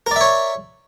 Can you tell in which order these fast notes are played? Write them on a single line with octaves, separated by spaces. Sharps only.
A#4 D5 E5 C#5